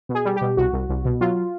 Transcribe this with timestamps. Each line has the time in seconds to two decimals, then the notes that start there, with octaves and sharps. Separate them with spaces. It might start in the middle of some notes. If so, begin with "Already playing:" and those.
0.09 B2
0.15 G#4
0.25 G3
0.36 G4
0.41 B2
0.57 C2 F#4
0.73 C2
0.89 C2
1.05 B2
1.21 F#3 F4